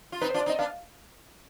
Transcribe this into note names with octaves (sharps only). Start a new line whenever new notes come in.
F4
C4 D#4 B4
C5
D4 F4
D5
C4 D#4 D#5
B3 D4 F5